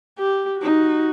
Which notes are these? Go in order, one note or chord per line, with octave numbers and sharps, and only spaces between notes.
G4
D#4 F#4